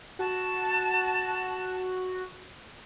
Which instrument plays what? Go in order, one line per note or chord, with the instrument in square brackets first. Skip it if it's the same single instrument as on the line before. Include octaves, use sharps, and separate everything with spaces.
[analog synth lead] F#4 [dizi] A5